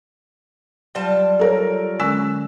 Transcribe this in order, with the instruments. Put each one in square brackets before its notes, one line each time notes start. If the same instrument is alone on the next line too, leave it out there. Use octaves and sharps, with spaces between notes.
[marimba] F#3 [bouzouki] G3 F4 A5
[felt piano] A4 A#4 C#5
[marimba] D3 G#3 C#4 [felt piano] E6